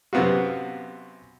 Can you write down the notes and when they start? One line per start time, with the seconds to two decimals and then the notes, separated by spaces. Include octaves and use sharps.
0.13 F#2 C3 B3 F4 F#4